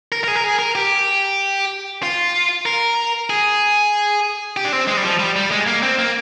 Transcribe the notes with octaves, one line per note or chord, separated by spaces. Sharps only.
A#4
A#4
G#4
A#4
G#4
A#4
G4
F4
A#4
G#4
G4
D4
C4
G#3
G3
F3
G3
G3
G#3
A#3
C4
A#3